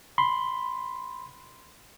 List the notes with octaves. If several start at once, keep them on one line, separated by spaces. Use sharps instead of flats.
B5 C6